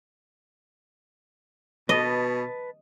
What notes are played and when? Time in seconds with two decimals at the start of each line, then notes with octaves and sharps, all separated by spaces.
1.89 B2 B4 D#5 A5